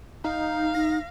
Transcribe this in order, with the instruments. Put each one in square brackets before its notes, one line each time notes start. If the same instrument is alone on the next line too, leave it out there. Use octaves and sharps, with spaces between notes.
[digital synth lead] D#4 [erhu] F5
[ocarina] D#4 [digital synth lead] A#6